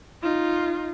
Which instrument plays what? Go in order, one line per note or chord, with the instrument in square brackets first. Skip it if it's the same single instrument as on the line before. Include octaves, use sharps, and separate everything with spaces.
[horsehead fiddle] D#4 F4